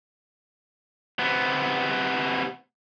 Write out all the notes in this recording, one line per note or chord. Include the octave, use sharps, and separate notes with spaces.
C3 B3